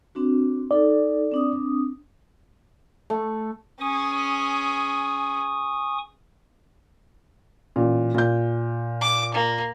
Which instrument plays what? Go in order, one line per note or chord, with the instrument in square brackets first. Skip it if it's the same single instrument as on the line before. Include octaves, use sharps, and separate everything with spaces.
[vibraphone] C4 D4 F#4
[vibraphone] D#4 A4 [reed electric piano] D5
[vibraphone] C4 D4 D#6
[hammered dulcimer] A3
[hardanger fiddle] C#4 G#4 [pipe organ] G#5 C#6 D#6
[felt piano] A1 A#2
A#2 G6
[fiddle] D6
A#3